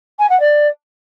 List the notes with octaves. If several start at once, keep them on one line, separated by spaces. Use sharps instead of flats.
G#5
F#5
D5